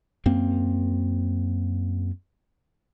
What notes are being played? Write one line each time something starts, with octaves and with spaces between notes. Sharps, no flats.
F#2 A#3 C4